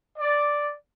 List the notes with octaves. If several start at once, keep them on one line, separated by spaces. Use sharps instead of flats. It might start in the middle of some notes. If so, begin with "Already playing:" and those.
D5